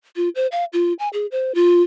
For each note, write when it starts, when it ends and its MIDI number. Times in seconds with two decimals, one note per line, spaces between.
0.16 0.29 65
0.35 0.47 72
0.52 0.65 77
0.73 0.93 65
0.99 1.08 80
1.13 1.26 68
1.31 1.54 72
1.55 1.83 65